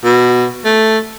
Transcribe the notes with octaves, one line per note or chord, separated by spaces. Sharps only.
B2
A3